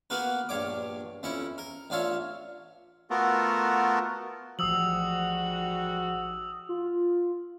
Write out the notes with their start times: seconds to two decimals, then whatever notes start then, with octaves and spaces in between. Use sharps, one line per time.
0.10 A#3 B3 F#4 A#4 B4
0.49 A#1 G2 C#5 D6
1.23 F2 C#4 E4 C#6
1.58 A#4
1.90 A1 D4 F4 C#5 E5
3.10 A3 B3 F4 F#4 A4 A#4
4.59 A1 G#2 F3 G3 F#4 D#6 E6 F#7
6.69 F4